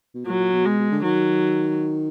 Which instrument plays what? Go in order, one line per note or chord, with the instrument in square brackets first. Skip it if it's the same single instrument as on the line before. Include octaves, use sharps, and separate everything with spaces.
[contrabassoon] B2
[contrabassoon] A#2 [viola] F#3
[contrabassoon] A#2
B2
[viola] G#3
[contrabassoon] B2
D3
[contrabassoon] D#3 [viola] F#3